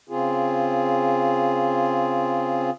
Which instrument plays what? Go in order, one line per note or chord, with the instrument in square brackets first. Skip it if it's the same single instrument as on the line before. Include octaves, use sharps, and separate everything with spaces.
[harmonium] C#3 C4 F4 G#4